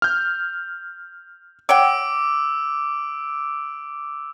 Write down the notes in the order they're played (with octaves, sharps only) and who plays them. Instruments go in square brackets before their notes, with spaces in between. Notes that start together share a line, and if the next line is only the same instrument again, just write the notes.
[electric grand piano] F6 G6
[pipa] C#5 F#5 G5 [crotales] D6 E6 D7